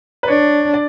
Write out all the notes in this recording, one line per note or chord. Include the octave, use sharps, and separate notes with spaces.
B4
D4 C#5
D5